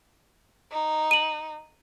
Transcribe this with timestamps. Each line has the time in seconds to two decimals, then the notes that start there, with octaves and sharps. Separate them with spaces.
0.72 D#4
1.11 D#7 F#7